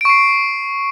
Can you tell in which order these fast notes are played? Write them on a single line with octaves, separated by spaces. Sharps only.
D7 C#6 C7